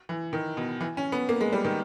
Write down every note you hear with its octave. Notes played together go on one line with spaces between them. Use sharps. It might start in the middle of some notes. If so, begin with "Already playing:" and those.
E3
D#3
B2
E3
C#4
B3
A#3
G#3
G3
D#3